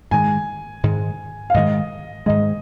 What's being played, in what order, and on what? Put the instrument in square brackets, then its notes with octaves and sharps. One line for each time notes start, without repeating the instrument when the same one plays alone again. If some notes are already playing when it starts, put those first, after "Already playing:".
[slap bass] G#2 D#3 G#3 [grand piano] G#5
[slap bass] G#2 D#3 G#3
[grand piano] F5
[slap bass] G#2 D#3 G#3 [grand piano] D#5
[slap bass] G#2 D#3 G#3 [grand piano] D#5